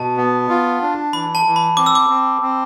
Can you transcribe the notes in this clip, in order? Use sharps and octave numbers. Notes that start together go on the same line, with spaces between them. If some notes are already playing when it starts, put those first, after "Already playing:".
Already playing: B2 A5
B3
F4
D4
E3 B5
A5
E3
B5
C4 D6
E6
D6
C4
C4